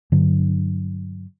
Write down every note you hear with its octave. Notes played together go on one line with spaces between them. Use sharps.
G2 D3 F#3